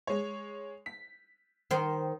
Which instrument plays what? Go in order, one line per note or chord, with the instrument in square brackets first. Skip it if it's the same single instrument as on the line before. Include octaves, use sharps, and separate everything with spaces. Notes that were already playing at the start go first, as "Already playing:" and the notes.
[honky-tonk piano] G#3 C#5
B6
[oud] D#3 C5